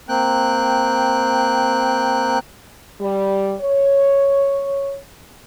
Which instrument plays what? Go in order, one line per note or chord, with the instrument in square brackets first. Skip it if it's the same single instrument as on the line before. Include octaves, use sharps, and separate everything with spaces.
[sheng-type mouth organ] A#3 C4 G5 F#6
[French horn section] G3
C#5